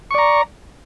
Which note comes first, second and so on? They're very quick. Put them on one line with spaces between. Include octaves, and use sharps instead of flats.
C#6 D5 A#5